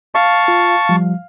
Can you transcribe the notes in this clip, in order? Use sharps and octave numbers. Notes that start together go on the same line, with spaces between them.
F5 A5 C#6
F4
F3 G3